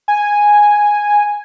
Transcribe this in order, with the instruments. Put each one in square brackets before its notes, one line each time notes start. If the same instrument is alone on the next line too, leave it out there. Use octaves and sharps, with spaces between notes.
[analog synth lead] G#5